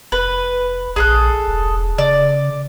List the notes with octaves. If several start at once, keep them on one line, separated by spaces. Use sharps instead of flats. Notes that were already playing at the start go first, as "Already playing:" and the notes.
F1 B4
A#1 G#4 A4 F#6
E1
C#3 D5